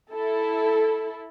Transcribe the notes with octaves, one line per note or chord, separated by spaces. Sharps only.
E4 A4